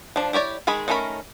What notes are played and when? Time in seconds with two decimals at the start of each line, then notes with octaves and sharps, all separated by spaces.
0.16 F3 D4
0.33 E4 G4 C#5 D5
0.67 D#3 G#3 G#4 B5
0.88 D#3 A3 C#4 A#4 B5